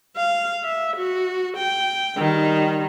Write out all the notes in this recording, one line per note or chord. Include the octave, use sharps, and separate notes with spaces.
F5
E5
F#4
G5
D#3 G3